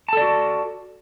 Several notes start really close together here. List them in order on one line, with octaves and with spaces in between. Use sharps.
A5 A4 D5 F#4